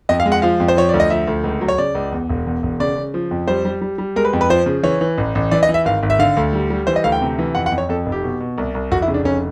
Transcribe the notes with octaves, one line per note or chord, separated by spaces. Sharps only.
F2 D#5
F5
G#3
F#5
F3 F5
F2
C5
F3 C#5
D2 D5
D#5
F3 E5
D2
C#2
F#3
C#5
C#3 D5
C#2
E2
E1
E2
E1
C#3 D5
C#3
F3
F2
G3 C5
G3
G3
G3
G#3 A#4
B4
F2
B4
F3 C5
C#3
E3 C#5
E3
A1
A1
E3 D5
D#5
E3
E5
G#1 F5
G#1
E5
D3 F5
D2
G3
G3
E3 C5
D#5
D2 F5
G5
C3
E3
F2 F#5
F#5
F2
C#5
F2 A4
F1
G4
B2
B2
C2
C2
F1 F#4
E4
C#3
D4
F1 C#4